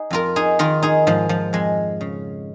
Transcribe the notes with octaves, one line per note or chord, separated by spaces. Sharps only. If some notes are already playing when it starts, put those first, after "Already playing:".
Already playing: D#4 G#4
F2 F4 A#4
D#4 G#4
D#3 F4 A#4
D#4 G#4
G#2 F3
F3
F2 G#3
C#3